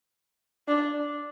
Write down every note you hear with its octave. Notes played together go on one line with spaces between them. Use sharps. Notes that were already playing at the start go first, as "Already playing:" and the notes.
D4